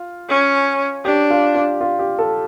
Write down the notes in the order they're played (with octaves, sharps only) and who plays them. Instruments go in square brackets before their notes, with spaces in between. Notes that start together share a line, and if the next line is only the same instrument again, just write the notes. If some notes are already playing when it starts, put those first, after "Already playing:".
Already playing: [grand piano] F4
[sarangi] C#4
[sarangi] D4 [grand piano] G4
[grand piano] F4
F4
F4
G4
A4